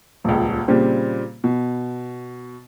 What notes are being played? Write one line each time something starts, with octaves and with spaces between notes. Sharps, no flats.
D#1 C#2
A#2 C#3 G3 C4
B2